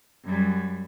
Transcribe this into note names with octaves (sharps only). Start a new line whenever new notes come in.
F#2 G3